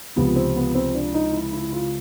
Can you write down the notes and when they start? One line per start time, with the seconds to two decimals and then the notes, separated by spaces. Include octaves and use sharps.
0.16 C#2 C3 F3 B3
0.36 C4
0.56 B3
0.75 C4
0.94 D4
1.14 D#4
1.33 E4
1.53 E4
1.72 F4